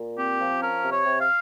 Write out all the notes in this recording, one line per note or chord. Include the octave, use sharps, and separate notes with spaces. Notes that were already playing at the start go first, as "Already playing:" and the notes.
Already playing: A#2
C4 G4
F3
C#4 A#4
C3
C#5
C3
F5